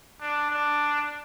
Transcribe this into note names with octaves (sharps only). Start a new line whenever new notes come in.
D4
D4